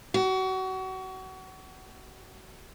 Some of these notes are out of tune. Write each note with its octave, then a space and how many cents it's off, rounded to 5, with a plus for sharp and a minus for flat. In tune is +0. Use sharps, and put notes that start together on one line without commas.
F#4 +30